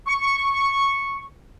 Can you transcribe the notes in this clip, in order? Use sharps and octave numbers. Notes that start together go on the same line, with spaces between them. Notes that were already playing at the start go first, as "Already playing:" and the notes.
C#6